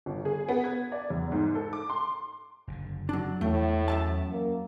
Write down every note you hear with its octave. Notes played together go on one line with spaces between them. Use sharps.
G1
G#4
B3
G#6
D5
E2
G#2
A4
D6
C6
F#1 A#2 D3
F#3 D4
E2 A2 A3
F#2 E5 A5
A#3